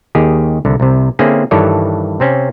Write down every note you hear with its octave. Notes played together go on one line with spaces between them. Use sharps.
D#2 D#3 G4 G#4
C2 D3
C2 C3
D3 A#3 C4 C#4 E4 G#4
G2 D#3 E3 A4 C#5 D5
C3 C4 C#4